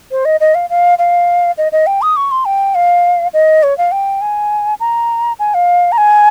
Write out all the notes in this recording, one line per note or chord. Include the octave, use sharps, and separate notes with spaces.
C5
D#5
D#5
F5
F5
F5
D#5
D#5
G5
D#6
C#6
C6
G5
F5
D#5
C#5
F5
G5
G#5
A#5
G#5
F5
A#5
G#5